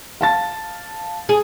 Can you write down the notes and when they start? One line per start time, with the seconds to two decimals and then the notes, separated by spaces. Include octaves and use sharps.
0.21 F5 A5 A6
1.29 G#4